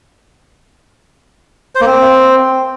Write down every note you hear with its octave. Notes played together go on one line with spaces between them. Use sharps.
C5
A#3
C4